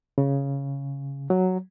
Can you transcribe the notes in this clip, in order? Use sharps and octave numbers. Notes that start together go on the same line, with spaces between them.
C#3
F#3